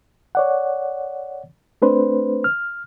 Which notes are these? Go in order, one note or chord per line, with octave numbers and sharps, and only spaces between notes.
C#5 D5 F#5
A3 C4 D4 B4 C5
F6